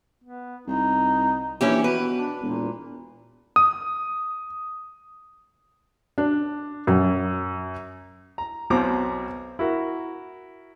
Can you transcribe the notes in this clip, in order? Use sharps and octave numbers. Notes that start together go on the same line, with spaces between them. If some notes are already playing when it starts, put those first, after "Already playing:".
B3
C2 D#4
A#1 E3 C#4 E4 G4
B2 B4
D4
E1 A#2
D#6
D4
F#2
A#5
B1 B2 C4 A#5 D6
E4 F#4 A#4